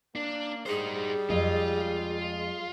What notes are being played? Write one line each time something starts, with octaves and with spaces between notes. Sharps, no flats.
A#3 D4
G3 D#4 G#4 C5
F2 G#3 F4 D#5